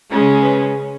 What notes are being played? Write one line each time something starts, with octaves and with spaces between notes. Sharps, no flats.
C#3 G#3 C#4
B4